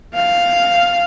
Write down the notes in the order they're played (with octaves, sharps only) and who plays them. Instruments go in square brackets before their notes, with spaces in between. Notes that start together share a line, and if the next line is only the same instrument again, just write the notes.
[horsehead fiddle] F5